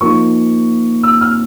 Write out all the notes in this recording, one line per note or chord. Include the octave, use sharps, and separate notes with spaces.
F3 A#3 D#4 C#6
E6
F6